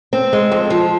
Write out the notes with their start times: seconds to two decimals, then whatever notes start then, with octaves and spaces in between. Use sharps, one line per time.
0.13 C4
0.33 G#3
0.51 F2
0.70 F3